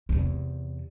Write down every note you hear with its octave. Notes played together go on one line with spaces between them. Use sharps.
E2 C3